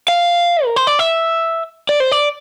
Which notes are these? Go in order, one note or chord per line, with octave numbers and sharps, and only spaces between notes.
F5
A#4
C5
D5
E5
D5
C5
D5